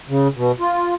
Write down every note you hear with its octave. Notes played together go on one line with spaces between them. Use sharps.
C#3
B2
F4